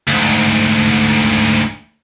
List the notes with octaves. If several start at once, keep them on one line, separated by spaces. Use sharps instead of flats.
D2 G#2